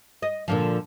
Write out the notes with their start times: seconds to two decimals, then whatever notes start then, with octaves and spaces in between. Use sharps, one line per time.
0.22 D#5
0.48 A#2 D3 F3